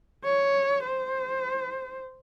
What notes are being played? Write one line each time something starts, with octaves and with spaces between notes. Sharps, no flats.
C#5
C5